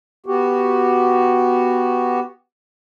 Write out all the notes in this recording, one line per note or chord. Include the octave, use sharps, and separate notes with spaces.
B3 F#4 G4